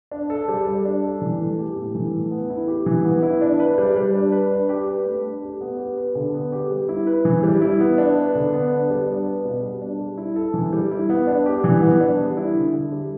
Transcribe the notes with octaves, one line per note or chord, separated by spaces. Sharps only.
D4
A4
G3
G3
D4
A4
E3
A3
G4
A2
E3
A3
B3
E4
G4
E3
B3
E4
D4
B4
G3
G3
D4
B4
D4
G4
B4
A3
D4
G4
B3
G4
B4
D3
B3
G4
G3
E4
B4
E3
G3
E4
B3
D4
B4
D3
B3
D4
G3
D4
B4
B2
G3
D4
G3
E4
A4
E3
G3
E4
B3
D4
G4
E3
B3
D4
G3
E4
D3
D3
G3